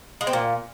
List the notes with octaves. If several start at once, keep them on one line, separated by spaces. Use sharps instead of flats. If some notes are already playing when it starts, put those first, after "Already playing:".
G#3
C4
A#2